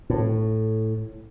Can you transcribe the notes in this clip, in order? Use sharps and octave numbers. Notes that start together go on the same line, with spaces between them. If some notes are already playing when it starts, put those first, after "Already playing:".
A2